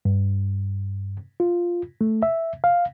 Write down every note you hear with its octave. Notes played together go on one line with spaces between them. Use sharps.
G2
F4
A3
E5
F5